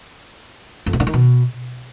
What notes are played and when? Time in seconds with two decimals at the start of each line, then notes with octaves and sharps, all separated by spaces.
0.86 F2
0.93 B2
1.00 D3
1.07 D#3
1.13 B2